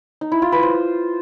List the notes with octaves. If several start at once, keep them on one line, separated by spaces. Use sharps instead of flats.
D#4
E4
F4
B4
C5